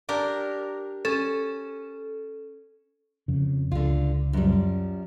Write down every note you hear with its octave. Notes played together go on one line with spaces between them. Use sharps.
D4 G4 A#4
C#4 A4
F2 C#3
C#2 D3 F4
F#2 F3 G3